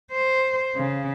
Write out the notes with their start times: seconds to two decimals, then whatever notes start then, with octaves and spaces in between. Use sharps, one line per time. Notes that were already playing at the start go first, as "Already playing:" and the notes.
0.12 C5
0.76 C#3